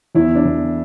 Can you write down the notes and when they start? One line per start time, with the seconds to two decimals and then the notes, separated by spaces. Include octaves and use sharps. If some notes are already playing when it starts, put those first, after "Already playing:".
0.15 E2 E4
0.35 D4
0.45 E2